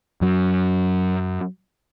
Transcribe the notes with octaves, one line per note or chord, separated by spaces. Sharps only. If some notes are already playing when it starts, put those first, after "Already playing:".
F#2 F#3